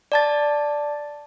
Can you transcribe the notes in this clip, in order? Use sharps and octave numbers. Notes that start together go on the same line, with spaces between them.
D5 A5 A6